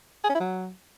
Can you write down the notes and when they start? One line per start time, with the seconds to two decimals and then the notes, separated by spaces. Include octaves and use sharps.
0.24 G#4
0.29 C#4
0.35 E4
0.40 F#3